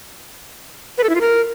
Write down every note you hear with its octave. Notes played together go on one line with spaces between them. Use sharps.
B4
A4
E4
F4
A#4